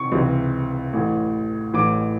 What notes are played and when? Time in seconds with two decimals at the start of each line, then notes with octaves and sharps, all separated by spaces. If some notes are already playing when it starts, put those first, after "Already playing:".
Already playing: C3 E3 C#6
0.12 C#2 C3 E3
0.93 A1 A2 E3
1.73 A1 A2 E3 D6